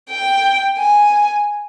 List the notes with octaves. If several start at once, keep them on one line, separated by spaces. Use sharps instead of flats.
G5
G#5